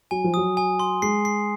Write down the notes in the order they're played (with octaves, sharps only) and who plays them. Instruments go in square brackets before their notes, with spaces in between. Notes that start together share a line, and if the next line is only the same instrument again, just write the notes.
[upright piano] F#3 [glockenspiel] G#5
[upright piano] F3
[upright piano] F#3 [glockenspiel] D#6
[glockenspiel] G#5
C6
[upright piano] G#3 [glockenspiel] C7
[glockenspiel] C7